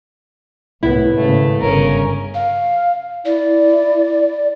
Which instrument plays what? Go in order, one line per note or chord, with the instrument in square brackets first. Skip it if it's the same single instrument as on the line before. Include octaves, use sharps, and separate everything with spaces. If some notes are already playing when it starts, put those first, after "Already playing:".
[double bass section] C2 A2 [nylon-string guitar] B3 E4
[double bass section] G#1 C#3 [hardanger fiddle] A3
[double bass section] G1 G#2 C#3 [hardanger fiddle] C#4 A#4
[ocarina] F5
[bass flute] E4 [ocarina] D5